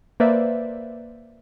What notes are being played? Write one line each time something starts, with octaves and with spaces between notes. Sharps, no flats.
A#3 B4 C5 D5 E5